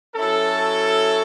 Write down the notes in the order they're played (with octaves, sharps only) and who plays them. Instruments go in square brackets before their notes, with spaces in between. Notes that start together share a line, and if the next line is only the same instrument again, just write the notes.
[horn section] F#3 C#4 E4 A4